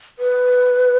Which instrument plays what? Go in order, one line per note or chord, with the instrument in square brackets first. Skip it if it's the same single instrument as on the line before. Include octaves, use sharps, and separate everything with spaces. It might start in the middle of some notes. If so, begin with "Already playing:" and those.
[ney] B4